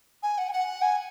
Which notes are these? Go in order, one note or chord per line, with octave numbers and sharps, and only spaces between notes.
G#5
F#5
G#5
F#5
G#5